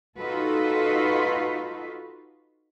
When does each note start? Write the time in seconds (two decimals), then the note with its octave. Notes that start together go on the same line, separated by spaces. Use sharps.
0.18 D#4 F4 F#4 A4 B4